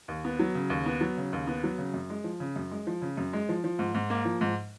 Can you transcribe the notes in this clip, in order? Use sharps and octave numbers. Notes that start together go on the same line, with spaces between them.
D#2
B3
F#3
C#3
D#2
B3
F#3
C#3
D#2
B3
F#3
C#3
F#2
G#3
F3
C#3
F#2
G#3
F3
C#3
F#2
G#3
F3
F3
G#2
G#2
A#3
F3
G#2